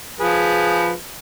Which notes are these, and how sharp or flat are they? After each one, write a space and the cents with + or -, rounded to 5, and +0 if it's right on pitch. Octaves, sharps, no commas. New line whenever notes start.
F3 +0 G#4 +0 B4 +0